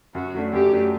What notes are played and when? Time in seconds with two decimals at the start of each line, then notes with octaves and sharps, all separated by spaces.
0.15 F#2 F#4
0.34 F#3 A3 D4
0.53 F#2 G4
0.73 F#3 A3 D4